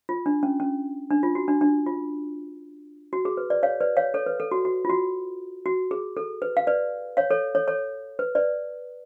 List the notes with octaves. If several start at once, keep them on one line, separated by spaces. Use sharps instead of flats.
F4
D4
C#4
C#4
D4
F4
F#4
D4
D4
F4
F#4
G#4
B4
B4 D5
C#5 F5
B4 D5
C#5 F5
A4 C#5
B4
A4
F#4
F#4
F4
F#4
F#4
G#4
A4
B4
F5
B4 D5
C#5 F5
A4 C#5
A4 C#5
A4 C#5
B4
B4 D5